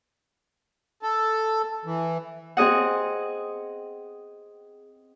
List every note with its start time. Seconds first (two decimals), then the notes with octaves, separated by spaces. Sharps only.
1.02 A4
1.85 E3
2.57 C4 G#4 D#5 F#5